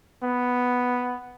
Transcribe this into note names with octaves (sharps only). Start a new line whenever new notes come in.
B3